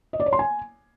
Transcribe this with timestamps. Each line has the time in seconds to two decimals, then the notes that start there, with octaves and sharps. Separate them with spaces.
0.13 D#5
0.20 D5
0.26 C#5
0.33 C6
0.39 G#5